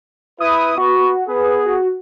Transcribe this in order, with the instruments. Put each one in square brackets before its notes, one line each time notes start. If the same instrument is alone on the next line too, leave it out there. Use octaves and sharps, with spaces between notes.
[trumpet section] E4 B4 [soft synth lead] D#6
[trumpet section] B3 B4 C#6 [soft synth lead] F#4
[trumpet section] B3 G#4 [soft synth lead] B4
[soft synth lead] F#4